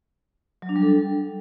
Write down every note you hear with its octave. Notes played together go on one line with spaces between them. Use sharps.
F#3
D4
G3
A4